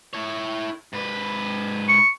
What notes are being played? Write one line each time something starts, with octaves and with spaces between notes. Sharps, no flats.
E4 C#5
G#2 B4
C#6